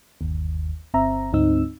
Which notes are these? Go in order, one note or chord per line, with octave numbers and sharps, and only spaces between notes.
G1 D#2
G1 C4 E5 A#5
D2 G#2 C4 D#4 E6